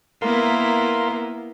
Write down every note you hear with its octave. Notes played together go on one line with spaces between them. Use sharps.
A#3 B3 E4 A#4 F5 C6